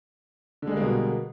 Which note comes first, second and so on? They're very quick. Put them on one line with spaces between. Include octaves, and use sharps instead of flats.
D3 G#3 G3 A#3 B2